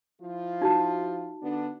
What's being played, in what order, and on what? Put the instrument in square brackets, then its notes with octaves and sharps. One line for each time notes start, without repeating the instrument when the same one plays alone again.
[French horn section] F3 E4 F4
[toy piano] D#4 F#4 A5
[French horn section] D3 B3 D4